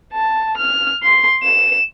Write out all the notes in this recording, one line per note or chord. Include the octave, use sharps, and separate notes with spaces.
A5
F6
C6
E7